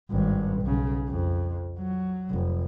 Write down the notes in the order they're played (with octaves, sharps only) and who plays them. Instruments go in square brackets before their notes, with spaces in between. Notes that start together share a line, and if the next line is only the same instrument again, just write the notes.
[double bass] G#1 G2
B1 C#3
F2
F#3
F1